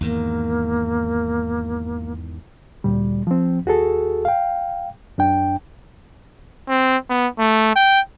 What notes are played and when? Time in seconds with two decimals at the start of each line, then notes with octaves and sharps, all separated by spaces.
0.01 E2 G#2 D#3 A#3
2.84 D2 A#2 G3
3.27 F3 C4
3.66 D#2 F#4 G#4 A4
4.25 F5 G5
5.18 F#2 D4 G5
6.69 C4
7.10 B3
7.39 A3
7.76 G5